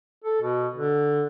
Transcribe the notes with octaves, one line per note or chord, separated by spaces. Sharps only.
A4
B2
D3